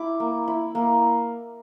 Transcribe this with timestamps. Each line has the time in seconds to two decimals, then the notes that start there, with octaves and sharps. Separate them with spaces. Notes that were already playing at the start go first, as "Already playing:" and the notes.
Already playing: E4 D6
0.20 A#3
0.48 E4
0.75 A#3